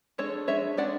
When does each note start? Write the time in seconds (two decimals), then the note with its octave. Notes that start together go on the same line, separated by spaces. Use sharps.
0.18 G#3 D4 A4 C#5
0.48 G#3 D4 C#5 E5
0.77 G#3 D4 D5 F#5